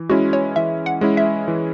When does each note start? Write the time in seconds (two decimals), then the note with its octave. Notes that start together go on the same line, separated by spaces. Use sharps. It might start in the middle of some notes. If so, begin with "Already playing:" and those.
Already playing: E3
0.10 G#3 C#4 E4 F#4
0.33 C#5
0.56 E3 E5
0.86 F#5
1.01 G#3 C#4 E4
1.17 E5
1.48 E3